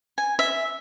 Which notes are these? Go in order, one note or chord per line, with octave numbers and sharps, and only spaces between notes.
G#5
E5